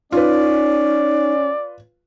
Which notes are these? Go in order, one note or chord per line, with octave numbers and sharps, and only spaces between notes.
C#4 D#4 F4 B4 D5